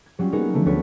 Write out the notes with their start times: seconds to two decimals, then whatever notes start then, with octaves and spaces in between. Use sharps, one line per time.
0.06 G#6
0.19 F#3 G3 C#4 F4
0.32 A#3 B3 D#4 F#4 G#4 A#4
0.53 D3 F3 A3 B3
0.66 D2 B3 F#4 C#5 B6